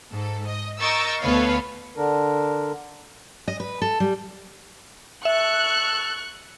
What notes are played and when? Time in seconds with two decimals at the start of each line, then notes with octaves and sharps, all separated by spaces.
0.13 G#2 A4
0.47 D#5
0.79 A#4 D#5 C#6 E6 G6 A6
1.22 D2 B3 A4 B4 C#5 F5
1.96 D3 D4 A#4
3.48 D#5
3.60 B4
3.82 A4
4.00 G3
5.25 A4 E5 C#6 F#6